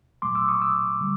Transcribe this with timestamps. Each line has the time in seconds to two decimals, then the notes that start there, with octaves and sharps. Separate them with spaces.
0.22 A#2 F#3 A3 C6 D6
0.35 D6 E6
0.48 C#6 D#6
0.62 D6 E6
1.01 D3 G3